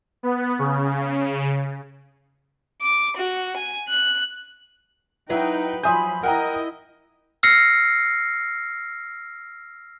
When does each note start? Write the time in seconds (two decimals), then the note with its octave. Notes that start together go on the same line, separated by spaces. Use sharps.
0.23 B3
0.59 C#3
2.81 D6
3.17 F#4
3.57 G#5
3.89 F#6
5.30 F#3 D#4 E4 B4 G5
5.83 F3 F#3 E5 G#5 B5 C6 D#6 G6
6.24 E4 A#4 D#5 F#5 G5 A#5
7.43 E6 F6 A#6 C7 C#7